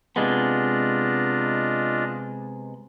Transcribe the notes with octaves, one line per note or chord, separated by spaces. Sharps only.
C3 G#3 B3 D4 F4 D#5